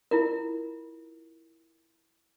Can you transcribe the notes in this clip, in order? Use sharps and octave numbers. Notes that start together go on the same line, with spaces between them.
E4 F4 A#4